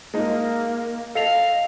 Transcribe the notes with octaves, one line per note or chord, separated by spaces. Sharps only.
G#3 A#3 D#4
A4 D#5 F5 C7 F7